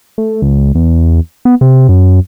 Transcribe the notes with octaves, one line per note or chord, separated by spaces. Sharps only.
A3
C#2
E2
B3
C3
F#2